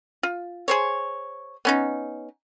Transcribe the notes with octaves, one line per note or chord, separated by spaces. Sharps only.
F4
G#4 C5 C#5
B3 C#4 D#4